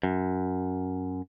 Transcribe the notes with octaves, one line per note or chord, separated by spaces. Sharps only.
F#2